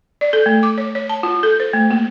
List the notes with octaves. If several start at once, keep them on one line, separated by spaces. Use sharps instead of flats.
D5
A4
A3
D6
C#5
C#5
A5
F4
A4
C5
A3
A#3